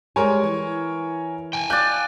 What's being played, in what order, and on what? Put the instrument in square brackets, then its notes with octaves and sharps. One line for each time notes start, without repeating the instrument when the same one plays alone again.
[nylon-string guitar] G3 G#3 C5 [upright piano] A#4 C#5 G#5
[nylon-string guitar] E3
[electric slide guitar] G5 G#5
[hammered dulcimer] D5 F5 [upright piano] F#6 G6